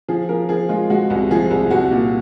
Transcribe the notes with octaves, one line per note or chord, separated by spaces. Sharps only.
F3 G#4
F3 A#4
F3 G#4
G#3 F4
G#3 F#4
C2
F3 G#4
C2
C2 F#4
A#2